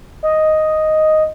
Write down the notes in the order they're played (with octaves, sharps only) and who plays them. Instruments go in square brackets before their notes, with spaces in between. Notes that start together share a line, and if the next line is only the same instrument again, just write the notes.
[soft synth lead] D#5